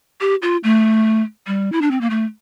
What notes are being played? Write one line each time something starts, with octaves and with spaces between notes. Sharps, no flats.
G4
F4
A3
G3
E4
D4
C4
A#3
A3